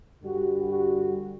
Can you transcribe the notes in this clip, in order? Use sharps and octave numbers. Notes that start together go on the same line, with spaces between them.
G2 D3 G3 F#4
F#4